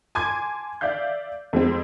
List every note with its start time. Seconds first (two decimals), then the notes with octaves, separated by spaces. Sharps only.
0.15 G#5 A5 C6 D6 G#6
0.81 D5 E5 F5 G6
1.53 F2 G#3 C4